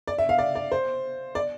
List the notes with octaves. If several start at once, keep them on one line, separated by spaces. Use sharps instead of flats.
D5
E5
F5
D5
D5
C5
D5